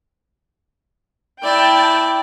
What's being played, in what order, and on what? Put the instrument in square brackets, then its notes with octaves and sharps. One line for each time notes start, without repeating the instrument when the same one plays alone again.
[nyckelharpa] E4 D5 [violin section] G5 A5